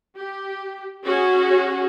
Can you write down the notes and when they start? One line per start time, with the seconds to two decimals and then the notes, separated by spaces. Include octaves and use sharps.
0.17 G4
1.05 C#4 F#4 G#4